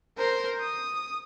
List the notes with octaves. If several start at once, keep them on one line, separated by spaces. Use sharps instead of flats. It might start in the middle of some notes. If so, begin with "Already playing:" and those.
A#4 C5
D#6